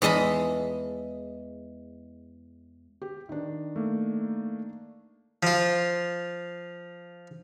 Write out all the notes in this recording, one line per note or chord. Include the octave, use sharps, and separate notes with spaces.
E2 G#3 D#5 A5 B5
G4
D#3 D4
A3 A#3
F3 F4